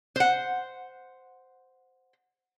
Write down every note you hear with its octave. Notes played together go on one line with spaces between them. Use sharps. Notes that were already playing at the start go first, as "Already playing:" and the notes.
C5 F#5